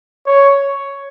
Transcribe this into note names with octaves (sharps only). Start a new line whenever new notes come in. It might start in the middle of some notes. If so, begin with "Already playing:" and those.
C#5